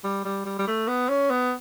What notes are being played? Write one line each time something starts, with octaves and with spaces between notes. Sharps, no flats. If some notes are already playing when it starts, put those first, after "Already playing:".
G3
G3
G3
G3
A3
B3
C#4
B3